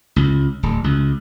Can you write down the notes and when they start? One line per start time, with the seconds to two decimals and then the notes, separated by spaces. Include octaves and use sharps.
0.16 C#2
0.63 D1
0.84 C#2